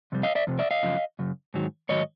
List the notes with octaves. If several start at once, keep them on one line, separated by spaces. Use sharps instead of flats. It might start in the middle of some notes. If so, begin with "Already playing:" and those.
F2 C3 G3
D#5 F5
D5 E5
F2 C3
D5 E5
D#5 F5
F#2 C#3 F3
F#2 C#3
G#2 D#3 F#3
G#2 D#3 F#3 C#5 D#5